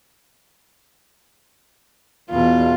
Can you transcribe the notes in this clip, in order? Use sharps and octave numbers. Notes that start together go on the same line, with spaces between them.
E2 B2 F4